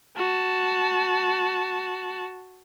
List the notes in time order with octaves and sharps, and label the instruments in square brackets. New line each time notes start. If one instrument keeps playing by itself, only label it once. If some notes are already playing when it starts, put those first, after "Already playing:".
[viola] F#4 A5